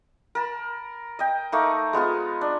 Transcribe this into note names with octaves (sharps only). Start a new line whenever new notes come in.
A#4 A5 B5
D#5 G5
A3 A#3 D#4
G#3 B3 F4 G#4
D4